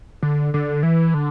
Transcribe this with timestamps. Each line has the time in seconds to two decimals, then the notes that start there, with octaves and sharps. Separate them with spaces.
0.23 D3
0.54 D3
0.83 E3
1.14 D3